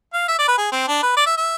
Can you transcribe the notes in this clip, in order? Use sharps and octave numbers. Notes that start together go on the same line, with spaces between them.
F5
E5
D5
B4
G#4
C4
D4
B4
D5
E5
E5